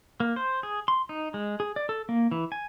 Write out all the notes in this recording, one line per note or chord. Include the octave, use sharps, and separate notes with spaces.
A#3
C5
G#4
C6
D#4
G#3
G#4
D5
A4
A#3
E3
G#5